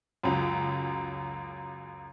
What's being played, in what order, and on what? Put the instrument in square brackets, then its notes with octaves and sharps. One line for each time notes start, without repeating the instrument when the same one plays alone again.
[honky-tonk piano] C#2 F#2